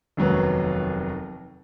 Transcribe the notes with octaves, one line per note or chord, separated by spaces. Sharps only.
F1 D#2 F#3 B3